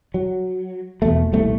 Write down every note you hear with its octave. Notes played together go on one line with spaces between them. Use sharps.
F#3
E2 B2 A3
D#1 C2 A3